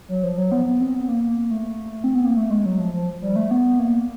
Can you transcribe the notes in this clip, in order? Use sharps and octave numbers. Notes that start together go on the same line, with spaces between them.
F#3
F3
F#3
B3
B3
C4
B3
A#3
A#3
A3
C4
B3
A#3
A3
G#3
F#3
F3
F3
G3
A3
B3
A#3